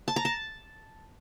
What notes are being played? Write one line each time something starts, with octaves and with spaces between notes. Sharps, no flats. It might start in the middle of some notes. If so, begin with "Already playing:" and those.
A5
A#5
A5